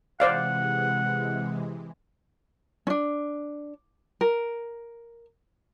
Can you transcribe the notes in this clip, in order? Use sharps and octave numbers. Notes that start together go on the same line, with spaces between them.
C3 E3 G#3 C5 D5 F5 F#5
C#4 D4
A#4